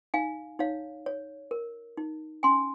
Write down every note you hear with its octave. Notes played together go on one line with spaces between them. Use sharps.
D#4 F5 G#5
D#4 C#5 F5
C#5
A#4
D#4
C#4 G#5 C6